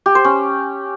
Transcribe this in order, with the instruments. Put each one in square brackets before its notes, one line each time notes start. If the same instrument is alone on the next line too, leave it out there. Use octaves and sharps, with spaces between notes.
[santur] G4
C5
C#4